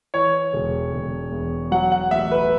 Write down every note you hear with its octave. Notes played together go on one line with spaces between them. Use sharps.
E3 C#5
E1
E1
E2
F#3 F#5
F#5
A1 E5
B4